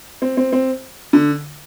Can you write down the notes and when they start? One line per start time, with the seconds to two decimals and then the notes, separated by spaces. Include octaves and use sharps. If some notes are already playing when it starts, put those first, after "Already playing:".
0.22 C4
0.37 C4
0.52 C4
1.13 D3